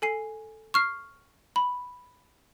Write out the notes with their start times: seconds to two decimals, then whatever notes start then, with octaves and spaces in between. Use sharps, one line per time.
0.02 A4 G#5 C7
0.74 C#6 F6 C7
1.56 B5